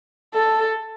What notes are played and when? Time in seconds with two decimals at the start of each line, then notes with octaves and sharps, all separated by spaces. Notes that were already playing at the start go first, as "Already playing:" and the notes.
0.34 A4